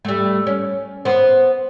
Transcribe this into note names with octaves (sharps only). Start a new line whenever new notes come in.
G3 A3
C#4
B3 C5